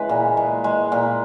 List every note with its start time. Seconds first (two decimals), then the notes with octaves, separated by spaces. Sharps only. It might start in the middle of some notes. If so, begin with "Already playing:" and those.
Already playing: C#3 E3 G#3 B4
0.09 A#2
0.37 G#3
0.64 G#3
0.92 A#2